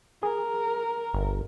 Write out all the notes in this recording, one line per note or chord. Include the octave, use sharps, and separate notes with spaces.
G#4 A#4
G1